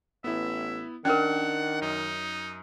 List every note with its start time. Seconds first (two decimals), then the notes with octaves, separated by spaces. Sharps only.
0.24 A1 B3 E4 E5
1.05 D#3 C#4 D4 A#4 F#5 F6
1.82 F#2 D#4